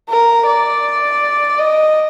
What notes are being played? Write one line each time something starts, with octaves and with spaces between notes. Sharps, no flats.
A#4
D5
D#5